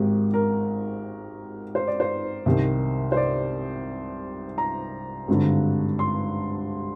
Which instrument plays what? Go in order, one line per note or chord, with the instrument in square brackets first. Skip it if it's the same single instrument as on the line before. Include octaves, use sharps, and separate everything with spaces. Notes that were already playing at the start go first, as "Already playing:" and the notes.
Already playing: [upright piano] G#1 G#2 D#3 G4
A#4
C5
D5
C5
C2 C3 D#3
C5
D5
A#5
G#1 G2 D3
C6